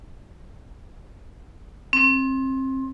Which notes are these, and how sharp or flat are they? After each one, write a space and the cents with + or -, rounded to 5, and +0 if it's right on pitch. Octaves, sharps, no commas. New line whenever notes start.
C4 +25